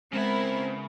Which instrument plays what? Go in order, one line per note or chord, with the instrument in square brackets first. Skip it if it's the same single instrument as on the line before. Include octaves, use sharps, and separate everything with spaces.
[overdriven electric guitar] C#3 B5 [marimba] G#3 [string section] B3 E4 A#4 [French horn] C4